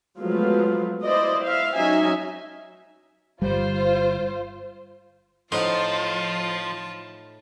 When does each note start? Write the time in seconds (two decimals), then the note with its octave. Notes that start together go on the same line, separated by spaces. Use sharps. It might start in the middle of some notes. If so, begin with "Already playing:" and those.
0.18 F3 F#3 G#3 A3 B3 F4
1.03 E4 C5 D5 D#5
1.43 E5 F5
1.76 F#3 C#4 D#4 D#5 E5 G#5
3.42 G1 G3 F4 C5
5.52 A2 F3 D#4 F4 C5 D#5 F#5 A5